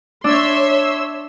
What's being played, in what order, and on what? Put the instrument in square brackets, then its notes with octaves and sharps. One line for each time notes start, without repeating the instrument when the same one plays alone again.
[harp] D4 [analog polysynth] C#5 E6 [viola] E5 C6